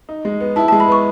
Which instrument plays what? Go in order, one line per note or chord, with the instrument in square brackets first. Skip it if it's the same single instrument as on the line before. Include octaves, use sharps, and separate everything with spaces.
[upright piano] D#4
G#3
B3
[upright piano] E4 [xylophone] A5
[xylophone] A5
[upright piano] G#3
[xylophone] B5
[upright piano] B3 [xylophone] C#6